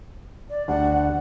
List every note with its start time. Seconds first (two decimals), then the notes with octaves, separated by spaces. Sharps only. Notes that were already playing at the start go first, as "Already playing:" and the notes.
0.50 D5
0.68 D2 G3 D4 F#5